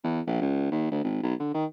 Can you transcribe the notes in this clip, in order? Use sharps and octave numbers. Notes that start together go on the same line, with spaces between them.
E2
A#1
C#2
D#2
D2
G#1
B1
D3
D#3